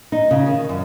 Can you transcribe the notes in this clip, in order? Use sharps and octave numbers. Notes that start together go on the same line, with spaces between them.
D#4
C#3
D#3
F#2